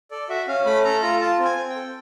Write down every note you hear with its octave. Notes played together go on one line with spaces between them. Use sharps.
A4 D5
F#4 E5
C#4 F5
A3 B5
A4 A#5
F4 A#5
F4 A5
C4
G#5
C4
G5
A4